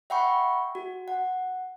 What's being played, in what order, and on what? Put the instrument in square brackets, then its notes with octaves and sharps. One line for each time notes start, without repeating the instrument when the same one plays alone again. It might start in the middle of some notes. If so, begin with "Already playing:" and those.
[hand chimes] E5 F#5 G5 B5 C#6
F#4
F#5